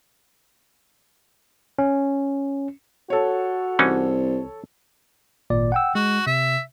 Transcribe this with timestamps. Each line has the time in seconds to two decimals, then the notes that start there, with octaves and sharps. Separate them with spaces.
1.79 C#4
3.10 F#4 A4 C#5
3.79 C2 E3 C#4 D#4
5.50 G#1 A#2 D5
5.72 F#5 G5 E6
5.95 G#3 F#4
6.27 C3 E5